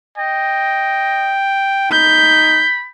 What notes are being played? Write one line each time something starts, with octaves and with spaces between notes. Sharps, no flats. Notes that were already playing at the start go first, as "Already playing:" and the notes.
D#5 G5
D#4 B5 G6